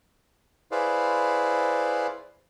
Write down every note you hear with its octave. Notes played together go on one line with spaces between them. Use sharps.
E4 G#4 B4 C5 D5 F5